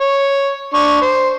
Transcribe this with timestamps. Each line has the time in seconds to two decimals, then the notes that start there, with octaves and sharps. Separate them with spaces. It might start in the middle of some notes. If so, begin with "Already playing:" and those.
0.01 C#5
0.74 D4 C#6
1.01 C5